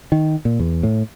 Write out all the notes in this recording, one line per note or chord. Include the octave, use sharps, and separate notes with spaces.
D#3
A#2
E2
A2